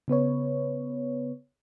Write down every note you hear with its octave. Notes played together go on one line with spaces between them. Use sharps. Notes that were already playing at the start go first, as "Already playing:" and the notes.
C#3 B3 B4 C#5